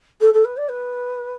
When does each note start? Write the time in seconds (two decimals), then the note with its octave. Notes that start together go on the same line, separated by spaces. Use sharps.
0.21 A4
0.34 A4
0.45 B4
0.57 D5
0.69 B4